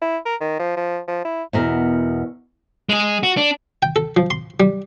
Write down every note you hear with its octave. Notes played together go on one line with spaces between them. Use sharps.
E4
A#4
D#3
F3
F3
F3
E4
E2 B2 A#4
G#3 G#4
F#4
D4
G5
A4
F3
C6
G3